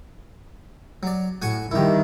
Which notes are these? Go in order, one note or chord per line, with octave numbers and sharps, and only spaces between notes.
F#3 D5
A2 F#4 G#5 C#6
G2 D#3 E4 G4